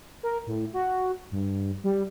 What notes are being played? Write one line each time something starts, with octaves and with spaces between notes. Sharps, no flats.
A#4
A2
F#4
G2
G3